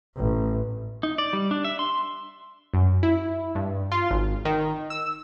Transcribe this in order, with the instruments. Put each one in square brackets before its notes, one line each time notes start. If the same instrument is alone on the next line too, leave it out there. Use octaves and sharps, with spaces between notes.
[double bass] A1
[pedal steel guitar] D#4
D5
G3
D4
E5
C6
[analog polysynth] F#2
E4
G2
F4
G#1
D#3
E6